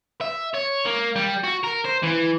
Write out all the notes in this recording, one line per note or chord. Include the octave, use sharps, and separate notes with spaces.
E5
C#5
A#3
G3
F#4
A#4
C5
E3